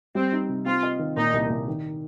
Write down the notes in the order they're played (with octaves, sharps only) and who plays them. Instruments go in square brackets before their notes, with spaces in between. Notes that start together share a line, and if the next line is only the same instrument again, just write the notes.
[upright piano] G3 [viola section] C4
[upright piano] D#4
C3
[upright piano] C4 [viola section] F4
[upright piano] D#5
D#3
[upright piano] A#2 [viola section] D#4
[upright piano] C2
C2
D#3